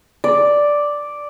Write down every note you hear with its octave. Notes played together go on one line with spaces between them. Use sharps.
D5